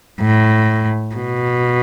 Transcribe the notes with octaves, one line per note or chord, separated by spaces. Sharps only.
A2
B2